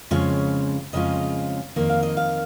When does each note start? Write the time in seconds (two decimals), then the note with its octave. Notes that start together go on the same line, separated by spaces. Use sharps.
0.11 F2 C#3 G#3 C#4 F4 C#5
0.93 F2 C#3 G#3 C#4 F4 D#5
1.76 F2 D#3 A#3
1.89 F5
2.03 D#5
2.17 F5